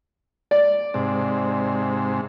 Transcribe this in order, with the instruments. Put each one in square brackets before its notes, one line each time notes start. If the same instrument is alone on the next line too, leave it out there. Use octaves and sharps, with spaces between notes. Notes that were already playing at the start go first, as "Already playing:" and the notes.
[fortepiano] D5
[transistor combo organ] G#2 C3